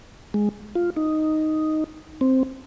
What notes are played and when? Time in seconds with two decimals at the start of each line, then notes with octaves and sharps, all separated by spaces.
0.34 G#3
0.75 F4
0.97 D#4
2.21 C4